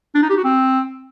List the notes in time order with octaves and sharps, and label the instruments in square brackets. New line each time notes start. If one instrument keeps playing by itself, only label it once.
[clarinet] D4
D#4
G4
F#4
C4